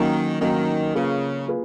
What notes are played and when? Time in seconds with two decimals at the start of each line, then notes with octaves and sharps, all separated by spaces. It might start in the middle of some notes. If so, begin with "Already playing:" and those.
Already playing: D#3 F#3 A#3 C#4
0.41 D#3 F#3 A#3 C#4
0.94 C#3 A#3 F4 G#4 B4
1.48 A#3 F4 G#4 B4